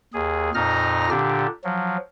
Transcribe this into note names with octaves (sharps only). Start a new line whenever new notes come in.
D#2 G#4
F2 A#2 D#4 F6 A#6
A#2 D3 D4 G4
F3 F#3